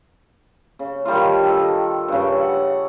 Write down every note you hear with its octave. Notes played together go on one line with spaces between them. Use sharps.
C#3
D#3 G3 D4 F4
A4 D#5
G2 C#3
F#5